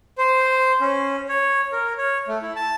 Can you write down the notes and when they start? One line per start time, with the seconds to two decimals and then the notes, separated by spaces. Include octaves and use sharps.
0.18 C5
0.81 C#4
1.29 C#5
1.73 A#4
1.98 C#5
2.28 A3
2.42 E4
2.56 A5